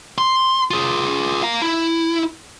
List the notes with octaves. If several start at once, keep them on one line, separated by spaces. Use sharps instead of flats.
C6
F4 G#4
F5 A#5
E4